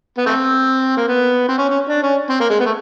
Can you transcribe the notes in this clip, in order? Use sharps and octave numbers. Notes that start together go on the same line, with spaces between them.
B3
A3 C4
A#3
B3
C4
C#4
C#4
D4
C#4
C4
A#3
G#3
B3
A3